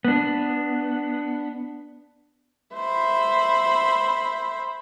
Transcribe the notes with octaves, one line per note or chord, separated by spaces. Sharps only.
B3 D4
C5 E5 B5